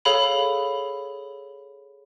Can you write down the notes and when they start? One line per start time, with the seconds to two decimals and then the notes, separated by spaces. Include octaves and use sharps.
0.05 G#4 A4 C#5 F5 B5 F#7